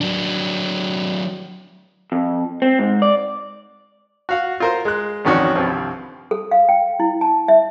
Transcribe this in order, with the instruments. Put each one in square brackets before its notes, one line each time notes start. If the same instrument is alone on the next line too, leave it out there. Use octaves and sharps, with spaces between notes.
[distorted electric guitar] F#3 D4
[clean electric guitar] F2
C4
G#2
D5
[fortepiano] F#4 F5 F#5
F4 A#4 C5
G#3 F#6
A1 F2 D#3 C#4 F#4 D5
C2 G2 F3 C4
[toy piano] A4
F5
G5
E4
A5
E5